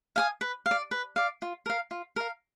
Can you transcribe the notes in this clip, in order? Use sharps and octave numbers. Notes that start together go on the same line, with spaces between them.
F5 G#5 D#6
B4
F5
D5
B4
D5 F5
F4
A#4 F5
F4
A#4 F5